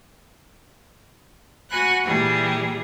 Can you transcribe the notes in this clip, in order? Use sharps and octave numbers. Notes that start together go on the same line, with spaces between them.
F#4 F#5 G#5 B5 F#6
A#2 E3 G3 G4 G#4